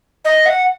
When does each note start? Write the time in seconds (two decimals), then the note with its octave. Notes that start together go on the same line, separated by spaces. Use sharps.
0.25 D#5
0.46 F#5